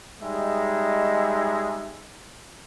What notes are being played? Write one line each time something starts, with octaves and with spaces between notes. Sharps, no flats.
G3 G#3 D#4 E5